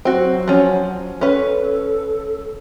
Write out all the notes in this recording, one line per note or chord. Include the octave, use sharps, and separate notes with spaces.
F#3 C4 F#4
F3 C#4
C#4 A4 B4